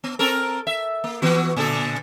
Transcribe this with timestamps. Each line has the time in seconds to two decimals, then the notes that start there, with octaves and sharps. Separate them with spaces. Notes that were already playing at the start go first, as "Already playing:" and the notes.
0.04 B3
0.19 C4 A4 A#4
0.67 E5
1.04 A#3
1.22 E3 B3 F#4
1.56 A#2 D3 A4